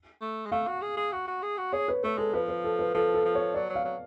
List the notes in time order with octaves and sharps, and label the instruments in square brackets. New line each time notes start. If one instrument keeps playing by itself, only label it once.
[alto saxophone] A3
G#3
[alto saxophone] A3 [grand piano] F5
[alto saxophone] F#4
G#4
G#4
F#4
F#4
G#4
F#4
[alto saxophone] G#4 [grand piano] C#5
[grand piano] B4
[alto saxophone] A3 [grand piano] B4
[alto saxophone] G#3 [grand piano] A4
[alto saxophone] F3 [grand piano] B4
[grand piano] B4
A4
B4
[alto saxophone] F3 [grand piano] A4
[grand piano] A4
[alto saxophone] F3
[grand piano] C#5
[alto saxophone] F#3 [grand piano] D5
[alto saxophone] F#3
[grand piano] F5
[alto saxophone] F#3